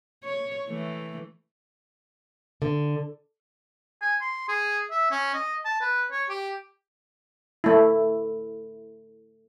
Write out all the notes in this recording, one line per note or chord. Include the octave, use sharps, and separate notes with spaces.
C#5
E3 A3
D3
G#5
C6
G#4
E5
C#4
D#5
A5
B4
C#5
G4
A3 E4